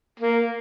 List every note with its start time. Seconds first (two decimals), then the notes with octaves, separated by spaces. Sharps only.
0.20 A#3